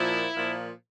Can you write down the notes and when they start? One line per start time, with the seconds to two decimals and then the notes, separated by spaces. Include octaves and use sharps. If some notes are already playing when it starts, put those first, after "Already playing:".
Already playing: A#2 F3 E4
0.35 A#2 F3